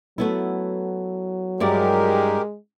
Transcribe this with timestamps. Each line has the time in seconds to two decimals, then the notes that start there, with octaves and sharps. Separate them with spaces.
0.18 F#3 A3 B3 E4
1.60 G2 G#3 E4 G4 A#4 D5